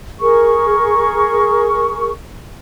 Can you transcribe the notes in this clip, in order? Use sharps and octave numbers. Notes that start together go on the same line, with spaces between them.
G#4 A#4 C#6